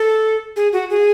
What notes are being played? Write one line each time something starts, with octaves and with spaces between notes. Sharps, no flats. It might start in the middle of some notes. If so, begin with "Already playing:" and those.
Already playing: A4
G#4
F#4
G#4